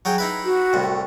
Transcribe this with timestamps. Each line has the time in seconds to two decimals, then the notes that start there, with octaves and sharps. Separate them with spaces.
0.05 F#3 G#4 G5
0.18 D#4 E4 B4
0.45 F#4
0.73 C2 A2